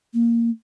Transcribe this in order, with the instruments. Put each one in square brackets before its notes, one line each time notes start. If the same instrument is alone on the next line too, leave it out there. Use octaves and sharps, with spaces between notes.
[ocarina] A#3